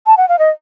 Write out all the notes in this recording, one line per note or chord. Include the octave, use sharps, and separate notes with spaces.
A5
F#5
F5
D#5